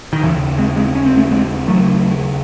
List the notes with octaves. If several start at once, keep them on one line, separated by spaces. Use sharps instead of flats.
D#3
D#2 C#3 E3
G#3 C4
G#3 C4
C#4
C4
A3 C#4
G#3 C4
D#2 C#3 F#3 A3